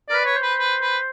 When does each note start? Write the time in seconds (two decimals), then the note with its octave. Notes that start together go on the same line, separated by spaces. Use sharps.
0.09 A#4 D5
0.13 B4
0.25 C#5
0.36 C5
0.42 B4
0.59 B4
0.82 B4